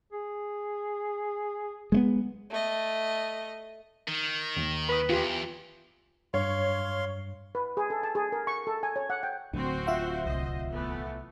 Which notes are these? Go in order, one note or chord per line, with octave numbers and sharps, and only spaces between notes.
G#4
G#3 A3 B3
A3 D#5
D#3
D#2
B4 B5 D#6
E2 F4 G4
G2 C#5 F5 C6
B4
G#4
A4
A5
G#4
A#4
C#6
A4
G#5
C#5
F#5
G5
D1 D2 D3 A#3 C4 F#4 C5
F4 E5 F#5
C2 C5 D#5
E3 A3 B3